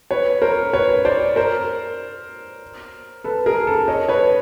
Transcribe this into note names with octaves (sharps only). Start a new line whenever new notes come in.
B4 C#5
A#4 C5
B4 C#5
C5 D5
A#4 C5
A4 B4
G#4 A#4
A4
C#5 D#5
B4 C#5